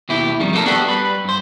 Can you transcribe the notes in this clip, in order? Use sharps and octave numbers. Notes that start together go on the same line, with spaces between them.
D#2 B2 E4 G4
F2 D#3 G3
A3 A#3 D#4 E4 A4 A#4
B3 D4 F#4 G4 A4
G3 B4
G2 C5